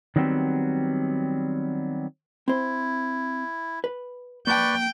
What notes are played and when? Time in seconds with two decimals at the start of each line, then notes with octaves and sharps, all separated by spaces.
0.16 D#3 F#3 G3 B3 C4
2.48 C4 E4 C5
3.84 B4
4.47 A#3 B4 D5 G5 A5 C#6